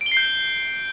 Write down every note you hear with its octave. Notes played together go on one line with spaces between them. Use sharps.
D7
G7
C7
G6